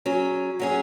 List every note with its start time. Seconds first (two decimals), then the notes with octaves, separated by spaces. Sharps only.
0.06 F#3 C#4 G#4
0.60 F#3 C#4 G#4